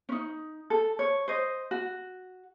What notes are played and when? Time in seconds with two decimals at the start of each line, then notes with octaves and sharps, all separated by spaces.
0.09 C#4 D#4
0.70 A4
0.99 C#5
1.28 C5 D#5
1.71 F#4